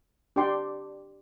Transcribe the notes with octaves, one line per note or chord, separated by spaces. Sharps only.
D4 G4 D5 G5 C6